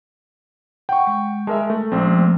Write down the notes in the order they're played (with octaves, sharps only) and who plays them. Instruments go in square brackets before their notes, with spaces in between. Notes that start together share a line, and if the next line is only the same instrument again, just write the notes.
[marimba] F#5 [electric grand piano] G5 C#6
[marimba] G#3
[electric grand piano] G#3 A#4 E5 [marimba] A5
[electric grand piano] A3
[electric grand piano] A#1 C4 [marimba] F3 G#3 C#4
[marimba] A3